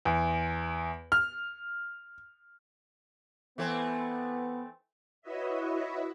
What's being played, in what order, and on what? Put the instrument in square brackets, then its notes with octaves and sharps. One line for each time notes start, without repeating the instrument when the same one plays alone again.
[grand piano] E2
F6
[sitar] E3 A3 C4 [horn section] B3
[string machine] E4 F#4 B4 C#5 D#5 E5